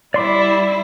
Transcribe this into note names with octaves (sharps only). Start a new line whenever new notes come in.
G3 E4 D5 C6 D6